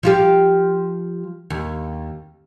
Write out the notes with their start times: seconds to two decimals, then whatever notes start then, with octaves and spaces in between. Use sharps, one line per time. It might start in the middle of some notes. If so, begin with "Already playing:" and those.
0.03 F3 F4 G4
1.50 D#2